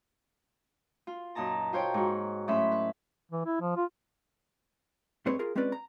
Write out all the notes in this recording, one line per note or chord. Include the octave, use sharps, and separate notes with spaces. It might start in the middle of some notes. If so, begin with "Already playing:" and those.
F4
F#2 A#2 D#4 A5 A#5
F4 C5 C#5 G5
G#2 F#4
A2 F#3 C#4 E5 B5 C6
B4
E3
E4
F3
F4
G2 G#3 C4 B4 C#5 C6
F4 G#4 A#4
G#3 C4 C#4 F4 B4 D5
A#5